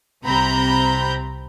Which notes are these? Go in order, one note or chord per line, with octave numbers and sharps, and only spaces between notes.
C2 C3 C4 A#5 B5 G6